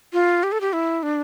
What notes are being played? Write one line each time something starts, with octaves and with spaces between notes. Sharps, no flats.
F4
G4
A4
G4
E4
D4